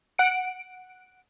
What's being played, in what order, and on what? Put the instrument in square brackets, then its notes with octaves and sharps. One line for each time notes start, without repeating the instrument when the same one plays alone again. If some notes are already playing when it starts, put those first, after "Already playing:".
[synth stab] F#5 D7